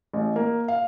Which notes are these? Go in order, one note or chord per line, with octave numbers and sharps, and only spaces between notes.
A1
A#3
F5